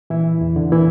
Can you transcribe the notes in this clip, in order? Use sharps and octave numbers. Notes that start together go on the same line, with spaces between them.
A#2 E3 E4
E2
D3
A#2 E3 E4